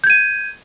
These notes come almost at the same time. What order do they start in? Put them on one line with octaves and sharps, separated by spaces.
G6 G#6 D#7